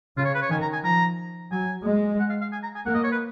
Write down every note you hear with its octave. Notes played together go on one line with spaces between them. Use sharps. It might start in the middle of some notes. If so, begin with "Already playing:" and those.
C#3 F4
C#5
B4
C#5
D#3 G#5
A#5
G#5
F3 A#5
F#3 G#5
G#3
F#5
F5
F5
G#5
A#5
G#5
A#3 F#5
D#5
C#5
B4